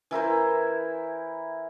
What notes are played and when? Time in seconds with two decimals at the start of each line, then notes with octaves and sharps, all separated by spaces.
0.11 E3 E4 A#4 C5